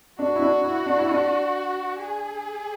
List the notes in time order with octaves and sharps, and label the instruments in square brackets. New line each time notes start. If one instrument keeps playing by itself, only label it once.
[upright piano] D4 [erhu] F#4
[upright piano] E4
D4
E4
D4
E4
D4
[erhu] G#4